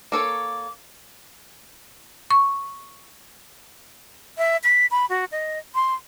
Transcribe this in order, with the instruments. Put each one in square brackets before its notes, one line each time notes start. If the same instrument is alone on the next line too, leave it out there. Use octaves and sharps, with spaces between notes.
[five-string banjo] A#3 A4 C#5 [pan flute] D6
[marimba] C#6
[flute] E5
B6
B5
F#4
D#5
C6